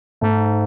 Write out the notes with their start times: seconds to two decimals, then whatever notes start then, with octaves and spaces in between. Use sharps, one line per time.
0.21 G#2 A3